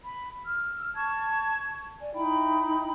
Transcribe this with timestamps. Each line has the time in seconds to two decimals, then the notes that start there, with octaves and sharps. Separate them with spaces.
0.04 B5
0.45 E6 F6
0.94 A5 C#6 G#6
1.99 D5 G#5
2.13 D#4 E4 G5 B5